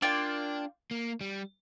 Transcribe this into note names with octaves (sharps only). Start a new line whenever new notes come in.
A#3 D4 F4 D5 G5
A#3
G3